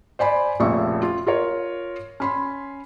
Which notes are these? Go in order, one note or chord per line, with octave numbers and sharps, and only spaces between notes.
C5 D5 G#5 B5
F1 F2 A#2 C#3 E5 C#6
F4
F4 A#4 C#5
C#4 B5 C6